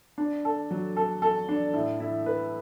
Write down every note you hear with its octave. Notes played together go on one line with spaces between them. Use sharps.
D4
A4
F#3
A4
A4
D4
A2
E4
B4